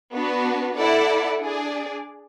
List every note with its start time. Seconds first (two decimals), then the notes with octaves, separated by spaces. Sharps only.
0.14 B3 D4 F#4 B4
0.76 E4 A4 D5 F#5
1.39 D4 G#4 D5